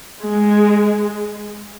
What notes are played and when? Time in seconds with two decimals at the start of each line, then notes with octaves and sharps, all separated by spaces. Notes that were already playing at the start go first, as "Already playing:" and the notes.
0.22 G#3